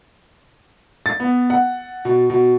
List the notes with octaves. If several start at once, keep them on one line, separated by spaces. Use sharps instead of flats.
A6
B3
F#5
B2
B2